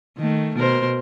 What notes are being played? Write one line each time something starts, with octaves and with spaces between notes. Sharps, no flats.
D#3 A3
B2 A#4 C5